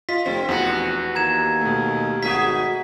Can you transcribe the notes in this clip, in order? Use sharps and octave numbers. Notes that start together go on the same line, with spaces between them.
F4 D#5 B6
F1 C4
F1 E2 B3 F#4
D#2 A#5 G#6 E7
B2 A3
G#1 F#4 G#4 E5 B6